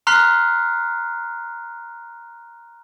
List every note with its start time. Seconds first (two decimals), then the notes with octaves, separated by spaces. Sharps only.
0.07 A#5 C6 F6 F#6 B6 C7